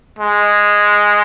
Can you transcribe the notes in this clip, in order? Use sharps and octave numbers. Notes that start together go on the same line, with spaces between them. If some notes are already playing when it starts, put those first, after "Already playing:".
G#3